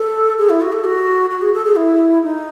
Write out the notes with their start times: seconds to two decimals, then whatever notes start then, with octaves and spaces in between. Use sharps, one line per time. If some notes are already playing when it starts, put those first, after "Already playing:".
Already playing: A4
0.38 G#4
0.50 E4
0.61 F#4
0.73 A4
0.84 F#4
1.31 F#4
1.42 G#4
1.54 A4
1.65 G#4
1.77 E4
2.23 D#4